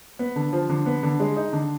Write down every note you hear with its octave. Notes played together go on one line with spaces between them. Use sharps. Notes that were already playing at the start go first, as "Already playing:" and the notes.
B3
D3
F3
D3
B3
D3
G#3
D#4
D3